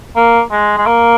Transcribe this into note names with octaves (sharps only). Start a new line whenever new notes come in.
A#3
G#3
G#3
A#3